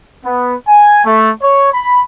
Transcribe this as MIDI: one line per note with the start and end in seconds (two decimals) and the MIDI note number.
0.25 0.55 59
0.68 1.03 80
1.05 1.31 57
1.42 1.69 73
1.73 2.01 83